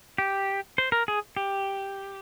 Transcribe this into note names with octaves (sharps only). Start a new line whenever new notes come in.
G4
C5
A#4
G#4
G4